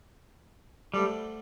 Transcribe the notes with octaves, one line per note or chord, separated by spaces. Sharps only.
D3 G3 A3 D4 A4 C5